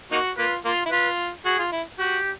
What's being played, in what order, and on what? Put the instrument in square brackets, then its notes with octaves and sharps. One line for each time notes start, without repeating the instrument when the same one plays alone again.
[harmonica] A#3 D#4 F#4
[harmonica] A#3 F4 [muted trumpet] B4
[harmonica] A#3 F4
E4
[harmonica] F4 [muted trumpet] B4
[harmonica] F#4 [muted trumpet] G#4
[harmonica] F4
E4
[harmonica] F#4 [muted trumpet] G4